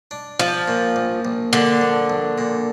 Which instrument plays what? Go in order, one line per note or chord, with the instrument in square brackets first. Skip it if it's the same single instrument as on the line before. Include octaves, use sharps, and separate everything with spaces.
[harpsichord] D4
[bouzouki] F3 [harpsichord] D4
[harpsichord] A#2
A#1
A#1
[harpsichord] A#2 [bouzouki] D3
[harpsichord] A#1
A#1
A#2